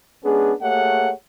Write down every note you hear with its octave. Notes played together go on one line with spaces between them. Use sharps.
G#3 B3 C#4 D4 G#4
A3 A#3 G4 G#4 C#5 F#5